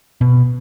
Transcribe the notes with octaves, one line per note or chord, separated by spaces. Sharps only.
B2